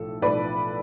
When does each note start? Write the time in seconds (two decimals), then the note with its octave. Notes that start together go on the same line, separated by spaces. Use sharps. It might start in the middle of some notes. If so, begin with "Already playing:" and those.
Already playing: B1 A2 F3 A4
0.22 B1 A2 F3 B4 D5